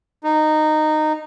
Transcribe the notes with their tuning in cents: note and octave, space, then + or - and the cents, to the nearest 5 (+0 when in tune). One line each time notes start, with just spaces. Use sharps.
D#4 -15